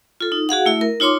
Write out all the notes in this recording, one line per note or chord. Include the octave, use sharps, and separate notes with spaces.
F4 A4
D#4
F#4 G#4 F5 F#5
A3 E4 E5
A#4
D#4 F4 C#5 C6 D6